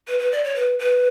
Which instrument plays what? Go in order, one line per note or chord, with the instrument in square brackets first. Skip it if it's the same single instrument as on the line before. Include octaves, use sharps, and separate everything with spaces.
[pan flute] B4
B4
D5
C#5
B4
B4